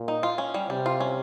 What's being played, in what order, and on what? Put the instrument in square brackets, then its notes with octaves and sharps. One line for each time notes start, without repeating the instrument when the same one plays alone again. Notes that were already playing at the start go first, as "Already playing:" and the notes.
Already playing: [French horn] A#2
[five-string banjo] D#4
F4
C#4
G3
[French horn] C3 [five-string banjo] G3
[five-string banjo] F4
C#4